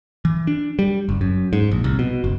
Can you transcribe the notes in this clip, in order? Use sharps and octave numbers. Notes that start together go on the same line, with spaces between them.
E3
D4
G3
F#1
F#2
G#2
A#1
C2
B2
F#1